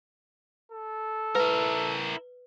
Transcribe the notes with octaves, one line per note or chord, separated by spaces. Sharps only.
A4
E4 A#4 B4